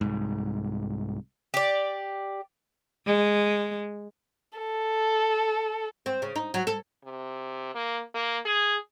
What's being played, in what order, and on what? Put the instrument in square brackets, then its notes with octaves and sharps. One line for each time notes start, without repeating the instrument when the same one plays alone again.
[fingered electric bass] C2 G#2
[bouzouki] G4 D5
[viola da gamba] G#3
[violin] A4
[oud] C4
C#3
D#4
F#3
A4
[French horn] C3
A#3
A#3
G#4